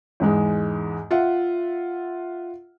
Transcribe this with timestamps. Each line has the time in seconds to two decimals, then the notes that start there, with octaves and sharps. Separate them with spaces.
0.20 E2 G#2 G#3
1.11 F4 E5 F#5